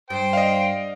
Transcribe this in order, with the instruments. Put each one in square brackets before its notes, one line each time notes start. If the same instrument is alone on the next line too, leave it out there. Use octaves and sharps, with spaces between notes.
[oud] G2 [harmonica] C5 G5
[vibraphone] D5 [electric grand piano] D#5 F5